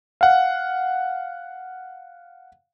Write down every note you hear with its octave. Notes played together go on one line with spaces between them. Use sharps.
F5 F#5